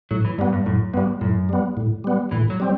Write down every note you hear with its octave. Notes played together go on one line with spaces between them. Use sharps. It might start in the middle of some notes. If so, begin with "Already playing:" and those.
A2 F#3
E3
G2 G3 B3
G2
F#2 A2
G2 G3 B3
F#2 A2
G3 B3
A2
G3 B3
A2 E3
F#3
G3 C4